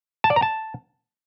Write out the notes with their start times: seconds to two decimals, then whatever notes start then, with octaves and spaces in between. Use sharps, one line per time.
0.24 A5
0.30 D5
0.36 A#5
0.42 A5